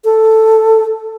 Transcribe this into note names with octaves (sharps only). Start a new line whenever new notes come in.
A4